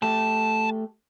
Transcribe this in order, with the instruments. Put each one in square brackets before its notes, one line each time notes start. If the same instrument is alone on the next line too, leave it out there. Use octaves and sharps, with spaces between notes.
[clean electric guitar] A3 G4 [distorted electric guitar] A5